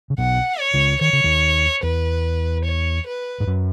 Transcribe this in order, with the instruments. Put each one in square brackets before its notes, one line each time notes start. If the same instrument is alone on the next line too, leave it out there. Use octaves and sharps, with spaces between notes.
[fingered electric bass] C#3
[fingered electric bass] B1 B2 [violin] F#5
[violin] C#5
[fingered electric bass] C#2 C#3
[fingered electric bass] D#3 [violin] C#5
[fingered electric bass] C#3
D#2 D#3
[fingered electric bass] E2 [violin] B4
[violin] C#5
B4
[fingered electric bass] G#2
F#2